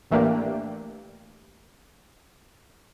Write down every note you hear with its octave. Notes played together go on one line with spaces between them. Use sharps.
A1 E3 A3 A#3 D4 G4